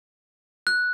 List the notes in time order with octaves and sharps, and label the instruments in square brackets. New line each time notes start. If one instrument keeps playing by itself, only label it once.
[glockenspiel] F#6